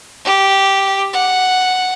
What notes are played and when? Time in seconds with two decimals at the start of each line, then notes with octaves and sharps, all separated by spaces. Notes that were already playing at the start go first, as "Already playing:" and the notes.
0.25 G4
1.13 F#5